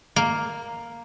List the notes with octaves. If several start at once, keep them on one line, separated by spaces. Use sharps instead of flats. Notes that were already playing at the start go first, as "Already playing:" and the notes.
A#3